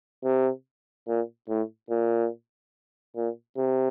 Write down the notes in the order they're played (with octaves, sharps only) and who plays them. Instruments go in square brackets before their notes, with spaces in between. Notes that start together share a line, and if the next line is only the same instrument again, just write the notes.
[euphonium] C3
A#2
A2
A#2
A#2
C3